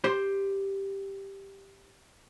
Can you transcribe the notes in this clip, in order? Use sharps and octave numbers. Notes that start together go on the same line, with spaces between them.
G4 C5 C6